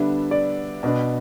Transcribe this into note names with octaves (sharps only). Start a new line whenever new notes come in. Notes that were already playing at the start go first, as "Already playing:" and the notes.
Already playing: D3 G3 B3 D4 E5
D5
B2 B3 D4